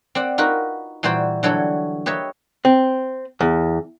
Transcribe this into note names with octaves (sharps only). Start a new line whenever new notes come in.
C4 D5 F#5
D#4 F4 F#4 A#4 B4
A#2 E3 G3 F#4 C5 G5
D3 E3 F#3 G3 A4 C#5
G4 B4 C#5 D#5 E5
C4
E2